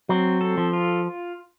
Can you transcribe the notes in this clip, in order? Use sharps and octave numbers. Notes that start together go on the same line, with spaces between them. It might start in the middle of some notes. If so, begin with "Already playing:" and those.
F#3 C4
A4
F3
F4